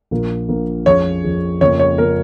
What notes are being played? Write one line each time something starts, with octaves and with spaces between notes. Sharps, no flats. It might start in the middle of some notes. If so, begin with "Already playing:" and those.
A#1 A#2 A#3 F4 A#4
A#1 A#2 A#3 F4 A#4
F2 F3 C#4 G#4 C#5
F2 F3 C#4 G#4
F2 C#3 F3 A#3 C#5
C#5
C#3 F3 A#3 A#4